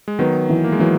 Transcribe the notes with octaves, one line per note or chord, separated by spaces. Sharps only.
G#3
D#3 F#3 B3
E3
A#3
G#3
E3 F#3